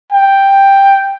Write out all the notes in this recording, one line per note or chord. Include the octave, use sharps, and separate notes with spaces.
G5